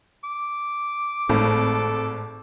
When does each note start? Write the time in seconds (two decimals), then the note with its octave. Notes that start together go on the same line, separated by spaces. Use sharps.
0.24 D6
1.29 G#1 A2 A4